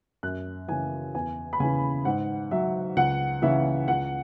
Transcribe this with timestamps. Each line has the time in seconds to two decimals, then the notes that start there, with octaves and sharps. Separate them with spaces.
0.23 F#2 F#6
0.68 C#3 E3 G#5
1.14 E2 G#5
1.53 B5
1.60 C#3 E3 G#5
2.05 G#2 F#5
2.51 F#3 E5
2.96 C#2 F#5
3.42 C#3 E3 E5
3.88 C#2 F#5